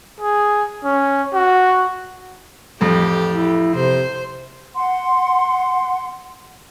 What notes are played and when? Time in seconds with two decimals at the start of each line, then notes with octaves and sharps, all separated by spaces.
0.20 G#4
0.84 C#4
1.34 F#4
2.81 A1 F2 G4
3.31 E4
3.75 C3 C5
4.75 F#5 C6